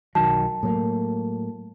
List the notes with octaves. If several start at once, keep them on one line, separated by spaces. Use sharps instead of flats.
B1 D#3 F#3 A5
A2 F#3 A#3